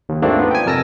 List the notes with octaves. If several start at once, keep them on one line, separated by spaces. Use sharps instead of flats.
D#2
G#2 A3 A#3 C4 D4 F4
B3
G5 G#5
F2 C3 A#4 A5 E6 A#6